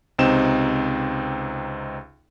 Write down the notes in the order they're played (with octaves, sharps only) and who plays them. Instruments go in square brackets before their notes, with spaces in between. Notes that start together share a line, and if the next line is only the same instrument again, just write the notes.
[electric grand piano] C#2 C3 C4 D#4 E7